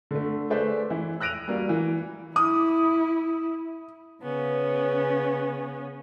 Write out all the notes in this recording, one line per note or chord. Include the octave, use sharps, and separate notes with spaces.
D3 A3
A3 G#4 B4 C5 D5 E5
E3 E4
E6 F#6 A#6 D7 D#7 F7
G3 A#3 F#4
E3
E4 D#6
C#3 B3 C#4